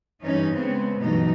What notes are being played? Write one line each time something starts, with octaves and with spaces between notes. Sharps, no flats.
G2 E3 C#4 D#4
C#3 G#3 B3 C4
G2 B2 E3 F#3 A3 D#4